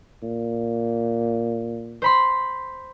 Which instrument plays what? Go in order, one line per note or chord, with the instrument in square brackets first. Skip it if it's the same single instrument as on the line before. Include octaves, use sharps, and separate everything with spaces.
[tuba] A#2
[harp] C5 B5 C6